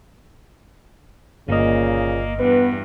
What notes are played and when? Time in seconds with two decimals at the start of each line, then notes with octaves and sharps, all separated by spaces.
1.49 G1 A#2 C#3 A#3 D#5
2.40 E2 G2 B3 B4